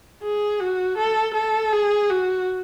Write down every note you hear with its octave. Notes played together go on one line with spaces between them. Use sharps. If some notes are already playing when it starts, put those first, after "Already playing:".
G#4
F#4
A4
A4
G#4
F#4